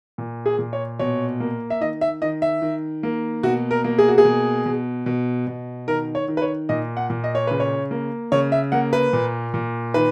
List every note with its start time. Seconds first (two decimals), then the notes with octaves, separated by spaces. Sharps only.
0.18 A#2
0.46 G#4
0.59 A#2
0.73 C#5
0.99 B2 C#5
1.40 A#3
1.70 E5
1.81 D#3 D#5
2.01 E5
2.22 D#3 D#5
2.42 E5
2.62 D#3
3.03 A#3
3.43 B2 F#4
3.71 A#4
3.84 A#3
3.98 G#4
4.08 F#4
4.18 G#4
4.25 B2
4.66 B2
5.06 B2
5.47 B2
5.88 D#3 A#4
6.15 C#5
6.28 D#3
6.37 B4
6.42 C#5
6.69 A#2 D#5
6.97 F#5
7.10 A#2
7.24 D#5
7.35 C#5
7.47 C#3 B4
7.60 C#5
7.91 A#3
8.32 C#3 C#5
8.52 E5
8.72 A#3 F#5
8.93 B4
9.13 A#2
9.54 A#2
9.94 D#3 B4